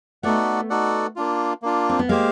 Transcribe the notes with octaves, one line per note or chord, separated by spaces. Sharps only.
A3 B3 D#4 F#4 A4 D5 F#5
D#4 F#4 A4 D5 F#5
A#3 D4 F4
A#3 D4 F4
C4
B3
G#3 A#3 G4 C5 F5